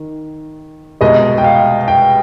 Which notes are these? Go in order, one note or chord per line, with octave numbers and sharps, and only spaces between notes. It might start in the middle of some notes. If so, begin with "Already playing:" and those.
Already playing: D#3
C2 B2 G#3 D#5
G5
F5
G5